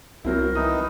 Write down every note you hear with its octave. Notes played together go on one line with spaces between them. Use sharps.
C2 F#3 C4 E4 A#4
D#3 E3 D#4 D#6